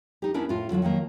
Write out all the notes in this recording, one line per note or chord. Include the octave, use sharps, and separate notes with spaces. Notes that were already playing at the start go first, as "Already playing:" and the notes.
D#4 G4
B3 C#4 D4 E4 A#4
A2 F4
D3 F#3 D#4 F4
D#3 F3 F#3 A#3